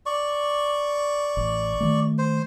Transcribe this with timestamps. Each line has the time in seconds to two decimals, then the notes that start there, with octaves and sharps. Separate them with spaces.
0.06 D5 C#6
1.37 A1
1.80 D#3 A3
2.18 C5